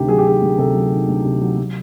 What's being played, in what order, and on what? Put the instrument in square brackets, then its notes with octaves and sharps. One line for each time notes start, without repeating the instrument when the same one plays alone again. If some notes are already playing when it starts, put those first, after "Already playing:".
Already playing: [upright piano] D2 C3 D#3 G4
F#3 G#4
G4
D#3 G#4
D2
C3 A4
F#3
D#3
D2
C3
F#3
F#3